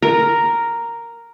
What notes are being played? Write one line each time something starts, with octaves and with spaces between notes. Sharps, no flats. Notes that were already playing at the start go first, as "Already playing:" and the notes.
A#4